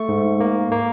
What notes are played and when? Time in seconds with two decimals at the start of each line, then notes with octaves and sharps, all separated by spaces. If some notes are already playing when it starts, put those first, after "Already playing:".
Already playing: A3 C#6
0.09 G#2
0.40 A#3
0.72 A#3